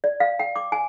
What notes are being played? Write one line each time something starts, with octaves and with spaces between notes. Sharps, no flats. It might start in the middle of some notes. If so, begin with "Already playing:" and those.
D5
F5
G5
D6
G#5